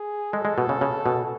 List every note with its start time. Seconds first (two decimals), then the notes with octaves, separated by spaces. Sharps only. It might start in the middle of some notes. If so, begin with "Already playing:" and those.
Already playing: G#4
0.32 G#3 A4
0.45 G#3
0.58 B2
0.69 C#3
0.81 C#3
1.06 B2